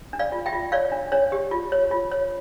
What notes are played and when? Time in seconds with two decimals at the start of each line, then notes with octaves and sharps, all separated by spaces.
0.13 D4
0.19 D5 F5
0.32 F4
0.46 E5 G5
0.53 F4
0.72 C#5 D5 F5
0.92 D4
1.12 D4 C#5
1.32 G4
1.51 F4
1.72 C#5
1.91 F4
2.12 C#5